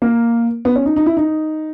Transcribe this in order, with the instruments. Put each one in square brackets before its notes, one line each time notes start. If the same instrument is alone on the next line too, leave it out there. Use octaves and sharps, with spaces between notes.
[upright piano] A#3
B3
C#4
D#4
D#4
E4
D#4